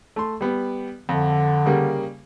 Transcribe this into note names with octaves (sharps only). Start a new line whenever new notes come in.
A3 C6
G3 B3
F2 D3
C#3 G3 A#3